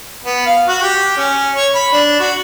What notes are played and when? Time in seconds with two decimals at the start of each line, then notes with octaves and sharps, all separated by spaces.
0.25 B3
0.46 F5
0.68 F#4
0.82 G4
1.17 C#4
1.55 C#5
1.75 B5
1.93 D4
2.20 F#4